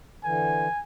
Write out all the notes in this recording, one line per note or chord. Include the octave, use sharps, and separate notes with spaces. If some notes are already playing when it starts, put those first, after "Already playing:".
D3 E3 G#5